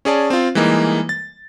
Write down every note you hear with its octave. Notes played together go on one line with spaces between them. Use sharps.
C#4 G#4 D5 A5
C4 F4
E3 G3 G#3 A#3 D#4
A6